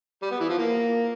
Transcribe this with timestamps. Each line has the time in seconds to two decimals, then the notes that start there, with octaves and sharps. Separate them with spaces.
0.22 G3
0.31 B3
0.40 E3
0.49 F3
0.58 A#3